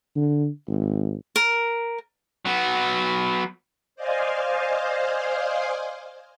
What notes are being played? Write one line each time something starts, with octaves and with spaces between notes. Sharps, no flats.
D3
G#1
A#4
F#3 B3
C5 D5 D#5 F5 G#5